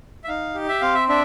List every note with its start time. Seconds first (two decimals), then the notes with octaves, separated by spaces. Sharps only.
0.24 E5
0.28 D#4 F5
0.55 G4
0.68 E5
0.81 C4 F5
0.94 E5
1.09 D4 E5